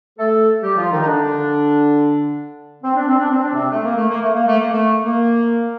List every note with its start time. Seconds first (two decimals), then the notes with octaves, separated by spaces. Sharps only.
0.18 A3 A4
0.62 G3 G4
0.77 F3 F4
0.91 D#3 D#4
1.02 D#4
1.07 D3 D4
2.83 C4
2.95 D4
3.07 C4
3.18 D4
3.31 C4
3.43 D4
3.54 C3 C4
3.71 A3
3.84 A#3
3.97 A3
4.09 A#3
4.22 A3
4.34 A#3
4.47 A3
4.60 A#3
4.72 A3
5.04 A#3